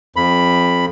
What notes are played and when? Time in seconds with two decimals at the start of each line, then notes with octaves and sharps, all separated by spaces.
0.16 F2 B5